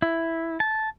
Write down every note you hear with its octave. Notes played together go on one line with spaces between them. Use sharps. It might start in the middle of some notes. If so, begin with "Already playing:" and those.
E4
A5